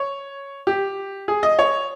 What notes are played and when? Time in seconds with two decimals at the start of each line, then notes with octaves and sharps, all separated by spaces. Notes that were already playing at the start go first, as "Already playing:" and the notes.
Already playing: C#5
0.67 G4
1.28 G#4
1.43 D#5
1.59 C#5